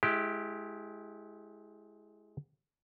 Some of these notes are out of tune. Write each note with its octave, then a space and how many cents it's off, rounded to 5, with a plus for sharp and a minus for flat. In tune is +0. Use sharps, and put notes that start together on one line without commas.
G#3 +20 E4 +0 G4 +0